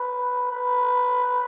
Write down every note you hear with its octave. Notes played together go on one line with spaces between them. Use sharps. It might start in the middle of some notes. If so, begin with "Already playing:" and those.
Already playing: B4
B4